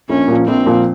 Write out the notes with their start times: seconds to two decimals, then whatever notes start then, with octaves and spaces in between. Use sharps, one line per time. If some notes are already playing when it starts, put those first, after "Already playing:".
0.09 A#1 C#4
0.28 A#2 F3
0.48 A#1 C4
0.66 A#2 F3